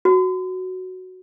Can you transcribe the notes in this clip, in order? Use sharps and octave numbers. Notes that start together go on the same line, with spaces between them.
F#4